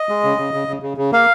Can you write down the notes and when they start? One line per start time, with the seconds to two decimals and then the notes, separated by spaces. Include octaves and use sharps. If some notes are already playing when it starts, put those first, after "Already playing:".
Already playing: D#5
0.09 G#3
0.24 C#3
0.38 C#3
0.54 C#3
0.68 C#3
0.82 C#3
0.97 C#3
1.12 A#3 F5